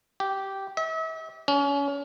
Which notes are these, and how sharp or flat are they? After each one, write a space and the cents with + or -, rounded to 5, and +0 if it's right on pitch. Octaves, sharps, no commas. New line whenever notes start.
G4 -10
E5 -40
C#4 +30